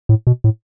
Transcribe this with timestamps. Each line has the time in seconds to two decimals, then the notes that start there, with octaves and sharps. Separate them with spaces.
0.09 A2
0.27 B2
0.44 A2